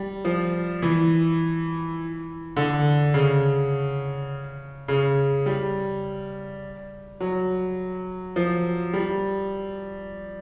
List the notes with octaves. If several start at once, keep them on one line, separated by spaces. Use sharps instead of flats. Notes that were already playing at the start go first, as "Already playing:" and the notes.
Already playing: G3
F3
E3
D3
C#3
C#3
G3
F#3
F3
G3